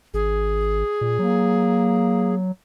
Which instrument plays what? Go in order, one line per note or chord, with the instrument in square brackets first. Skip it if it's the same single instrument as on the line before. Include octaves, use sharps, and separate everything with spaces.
[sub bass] G#1 [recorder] G#4
[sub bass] A#2
[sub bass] F#3 [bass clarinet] A#3